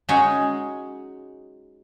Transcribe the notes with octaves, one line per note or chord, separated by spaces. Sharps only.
G#3 C#4 D#4 F#4 G#4